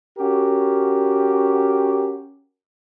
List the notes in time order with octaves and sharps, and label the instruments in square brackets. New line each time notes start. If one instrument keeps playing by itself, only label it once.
[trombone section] C#4 F#4 G4 A#4